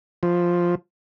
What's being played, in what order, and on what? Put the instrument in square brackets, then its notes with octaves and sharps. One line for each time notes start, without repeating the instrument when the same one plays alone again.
[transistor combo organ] F3